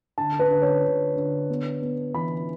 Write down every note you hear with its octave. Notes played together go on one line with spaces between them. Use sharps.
D3 A5
B4
D3
C#5
D3
D3
B3
B3
E3 B5